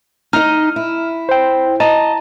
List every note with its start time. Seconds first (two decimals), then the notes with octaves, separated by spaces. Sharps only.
0.33 D#4 D#5 F6
0.76 E4
1.29 C5 G5
1.80 D#5 A5 A#5